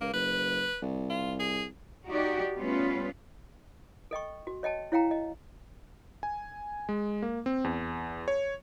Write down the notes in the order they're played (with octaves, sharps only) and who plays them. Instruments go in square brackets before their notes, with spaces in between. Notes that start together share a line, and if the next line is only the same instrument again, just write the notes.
[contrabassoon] C#2 [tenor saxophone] A#3
[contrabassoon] F#1 [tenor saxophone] B4
[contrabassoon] C2
[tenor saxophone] F4
G#4
[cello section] D#4 F#4 G4 D5
G3 A3 B3 C#4 F4 B4
[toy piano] A4 D#5 G5 C#6
F#4
C#5 D#5 G5 A5
E4 C#5 F5 G5 A#5
D#5
[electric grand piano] G#5
G#3
A#3
C4
E2
C#5